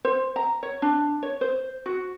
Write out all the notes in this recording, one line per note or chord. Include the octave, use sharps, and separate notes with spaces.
C5
A#5
C#5
D4
C#5
C5
F#4